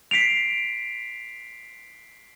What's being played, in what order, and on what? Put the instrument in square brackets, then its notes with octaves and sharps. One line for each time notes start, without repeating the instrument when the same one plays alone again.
[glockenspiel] B6 C7 D7 F7